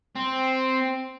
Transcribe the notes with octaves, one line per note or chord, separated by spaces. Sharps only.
C4